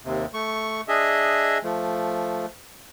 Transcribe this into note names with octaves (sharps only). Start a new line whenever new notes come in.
D#2 C3
A3 C#6
D4 G#4 D#5 E5
F3 A3